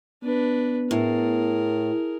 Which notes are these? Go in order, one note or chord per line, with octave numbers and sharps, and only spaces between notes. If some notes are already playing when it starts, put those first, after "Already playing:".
B3 D4 B4
A2 G#4 A#4